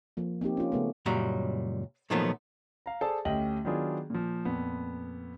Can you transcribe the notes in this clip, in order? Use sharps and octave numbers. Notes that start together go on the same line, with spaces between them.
F3 A#3
A#3 C4 D#4 G4
C#4 F4
C#3 A3 B3
C#2 F#2 A#2 G3 F#4 A#5
A#2 D#3 F3 F#3 A3 B3
F5 A#5
G#4 A4 C5 D5 A5
D2 C#4 G4 D#5 G5 F#7
D#3 F#3 B3 D4 F4 G#4
A#2 F3
F2 A#2 B3